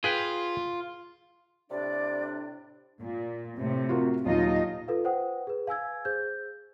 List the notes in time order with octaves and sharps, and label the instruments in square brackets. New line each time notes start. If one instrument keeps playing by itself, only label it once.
[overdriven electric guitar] F4 [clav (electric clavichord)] G#4 B4 G5
[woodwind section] A2 C3 D4 [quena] D5
[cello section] A#2
A2 C3
[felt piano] F4 F#4 A#4
[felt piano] D#1 F#3 [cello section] D#4 F4 D#5
[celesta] F4 A4 B4 F5
B4 C5 F#5 G5 D#6
G#4 B4
F5 G#5 E6 G#6
G#4 C5 G6